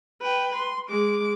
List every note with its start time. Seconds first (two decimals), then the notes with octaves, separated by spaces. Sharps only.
0.22 B4 G5
0.56 C6
0.89 G#3 D6